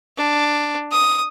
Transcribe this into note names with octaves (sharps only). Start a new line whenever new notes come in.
D4
D#6